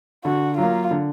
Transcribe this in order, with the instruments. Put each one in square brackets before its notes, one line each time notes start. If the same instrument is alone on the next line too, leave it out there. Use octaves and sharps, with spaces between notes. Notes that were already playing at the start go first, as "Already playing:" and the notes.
[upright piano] D3 [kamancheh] F#4
[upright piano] F#3 A#3 [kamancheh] F4
[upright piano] D3